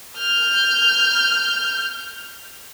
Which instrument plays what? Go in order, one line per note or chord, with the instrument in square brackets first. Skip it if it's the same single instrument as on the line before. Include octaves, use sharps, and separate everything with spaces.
[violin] F6 G6